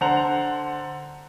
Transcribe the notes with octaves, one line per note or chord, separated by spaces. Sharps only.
D3 C5 F#5 A#5 F7